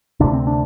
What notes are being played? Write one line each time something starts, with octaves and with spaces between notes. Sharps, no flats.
D2 C3 D4
C4
D4